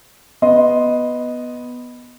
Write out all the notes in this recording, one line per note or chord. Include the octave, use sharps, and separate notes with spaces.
B3 D#5 C6